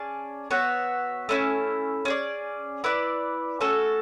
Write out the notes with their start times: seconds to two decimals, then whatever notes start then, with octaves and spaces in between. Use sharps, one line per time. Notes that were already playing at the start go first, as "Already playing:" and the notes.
Already playing: C#4 G#4 D5 A5
0.50 B3 F#4 C#5 E5
1.29 A3 C#4 E4
2.05 C#4 G#4 D5
2.84 E4 B4 D5
3.60 A3 C#4 F#4 A4